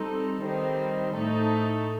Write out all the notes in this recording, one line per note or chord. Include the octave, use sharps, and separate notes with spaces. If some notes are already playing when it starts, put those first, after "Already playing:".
Already playing: G3 C4 D#4 A4
D#3 G3 C4 D#4
A2 A3 D#4 A4